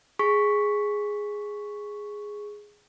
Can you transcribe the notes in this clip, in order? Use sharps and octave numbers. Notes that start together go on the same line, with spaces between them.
G#4 C#6 B6